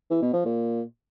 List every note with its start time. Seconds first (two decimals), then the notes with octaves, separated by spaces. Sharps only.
0.10 E3
0.22 B2
0.33 F3
0.45 A#2